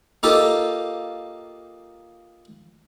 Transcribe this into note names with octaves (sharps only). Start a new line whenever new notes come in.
A#3 D#4 F4 G4 A4